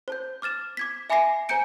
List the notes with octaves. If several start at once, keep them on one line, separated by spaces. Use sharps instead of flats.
C5 A5 G6
D6 F6 A6 E7
D6 G#6 B6
E5 G#5 B5 D6 A#6 C7
C5 G#5 A#5 G6 C#7 D7